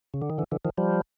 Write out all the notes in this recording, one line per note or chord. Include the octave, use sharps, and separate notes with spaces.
C#3
D3
D#3
D3 E3
D3 E3
D#3 F3
F3 G3